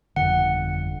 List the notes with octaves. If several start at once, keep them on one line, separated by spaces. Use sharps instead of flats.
G1 F2 D3 F#5